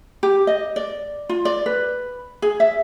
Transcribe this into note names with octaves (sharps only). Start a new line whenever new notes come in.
G4
D#5
D5
F4
D5
B4
G#4
E5